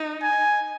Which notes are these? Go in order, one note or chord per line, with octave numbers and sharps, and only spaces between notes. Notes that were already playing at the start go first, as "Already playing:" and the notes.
Already playing: D#4
G#5